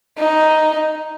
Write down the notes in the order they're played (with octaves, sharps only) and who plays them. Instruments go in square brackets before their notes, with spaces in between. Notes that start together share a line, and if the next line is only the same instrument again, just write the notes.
[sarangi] D#4